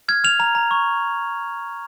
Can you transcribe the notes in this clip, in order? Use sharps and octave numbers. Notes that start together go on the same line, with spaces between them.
F6 G#6
F6 F7
A#5 F7
A#5
C#6